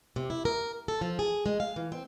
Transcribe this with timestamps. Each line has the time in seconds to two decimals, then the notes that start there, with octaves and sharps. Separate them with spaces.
0.16 C3
0.30 E4
0.45 A#4
0.88 A4
1.01 F3
1.19 G#4
1.46 G#3
1.60 F5
1.76 E3
1.92 C4